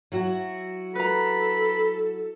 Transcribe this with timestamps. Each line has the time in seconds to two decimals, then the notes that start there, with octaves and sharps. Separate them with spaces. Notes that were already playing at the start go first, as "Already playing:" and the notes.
0.12 F#3 E4 F#4
0.95 A4 B4 A#5 B5